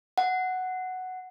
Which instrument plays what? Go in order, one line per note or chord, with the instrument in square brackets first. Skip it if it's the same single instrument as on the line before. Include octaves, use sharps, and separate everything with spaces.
[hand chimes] F#5